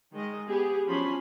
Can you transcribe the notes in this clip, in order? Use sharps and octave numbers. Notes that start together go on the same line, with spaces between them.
D#3 G#3 D#5
B3 G4 G#4
F3 F#3 C#4 D4 B5 C6